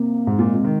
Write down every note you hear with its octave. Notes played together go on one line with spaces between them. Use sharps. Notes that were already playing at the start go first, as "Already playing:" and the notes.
Already playing: C3 A#3
G#2 G#3
A#2
C3
D#3